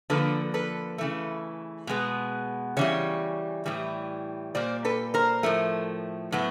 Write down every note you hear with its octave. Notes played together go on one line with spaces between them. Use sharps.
D3 F3 A#3 A4 B4
A4 B4
C#3 E3 A3
B2 G#3 B3
C#3 E3 G3 C#5
A2 E3 G3
A#2 G3 A#3 C5 D5
A4 B4
A#4 C5
A2 F3 A3
A2 F#3 B3